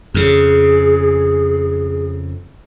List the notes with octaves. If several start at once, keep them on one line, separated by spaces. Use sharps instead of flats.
F2 C#3 G#4